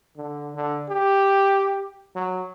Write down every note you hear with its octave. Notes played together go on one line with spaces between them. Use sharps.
D3
D3
G4
F#3